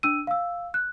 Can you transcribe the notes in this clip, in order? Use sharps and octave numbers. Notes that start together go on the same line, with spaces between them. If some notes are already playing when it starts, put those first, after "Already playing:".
D4 E6 D#7
F5 E6
F#6